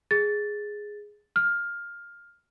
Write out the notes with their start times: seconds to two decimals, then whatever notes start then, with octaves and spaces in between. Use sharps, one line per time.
0.11 G#4 A6
1.36 F6